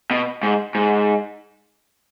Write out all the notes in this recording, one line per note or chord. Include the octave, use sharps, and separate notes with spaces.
B2
G#2
G#2